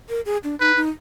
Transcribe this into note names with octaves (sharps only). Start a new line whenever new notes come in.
A#4
G#4
D4
D#4 B4
D#4